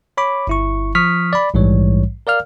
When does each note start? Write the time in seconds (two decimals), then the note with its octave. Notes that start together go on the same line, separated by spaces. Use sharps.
0.17 C#5 B5 D6
0.47 G1 E4 C#6
0.95 F3 C#6 D#6 F6 B6
1.33 D5 B5
1.54 A#1 G#2 E3 G3 C#5
2.27 A#4 D5 F5 F6